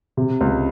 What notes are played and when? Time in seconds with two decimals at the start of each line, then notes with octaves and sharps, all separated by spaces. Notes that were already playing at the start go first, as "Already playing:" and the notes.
0.17 C3
0.41 C#2